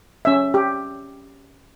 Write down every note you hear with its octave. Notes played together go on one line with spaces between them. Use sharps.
C#4 E5
G4